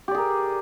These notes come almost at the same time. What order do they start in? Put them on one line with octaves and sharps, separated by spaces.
G4 D5 G#4 A#4